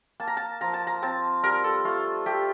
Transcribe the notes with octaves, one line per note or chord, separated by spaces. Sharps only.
A#3 A5
A#5
A5
F3 A#5
A5
A#5
C4 A5
G3 A#4
A4
A3 F4
A3 G4